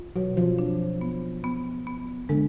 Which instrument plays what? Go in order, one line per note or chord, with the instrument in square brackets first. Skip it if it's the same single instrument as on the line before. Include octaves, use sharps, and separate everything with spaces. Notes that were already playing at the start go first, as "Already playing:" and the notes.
Already playing: [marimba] F4
[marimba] B2 [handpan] F#3
[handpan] F3
[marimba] D4
B3
B3
B3
[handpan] D3 [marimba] G#3